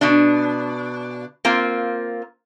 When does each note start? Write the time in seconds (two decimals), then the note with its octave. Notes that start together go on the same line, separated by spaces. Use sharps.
0.01 B2 D4
1.45 A#3 C4 F4